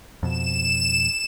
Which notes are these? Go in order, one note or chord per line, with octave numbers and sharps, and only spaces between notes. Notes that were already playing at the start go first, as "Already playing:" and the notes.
F2 B2 E7